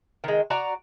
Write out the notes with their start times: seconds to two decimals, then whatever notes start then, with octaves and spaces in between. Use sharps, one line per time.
0.24 D#3 G#3
0.50 F#4 D5 A#5